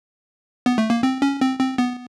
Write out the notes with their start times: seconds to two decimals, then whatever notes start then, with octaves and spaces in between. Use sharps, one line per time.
0.66 B3
0.78 A3
0.90 A#3
1.03 C4
1.22 C#4
1.41 C4
1.59 C4
1.78 B3